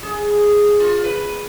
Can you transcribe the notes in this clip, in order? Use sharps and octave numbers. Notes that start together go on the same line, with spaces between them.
G#4
F4
B4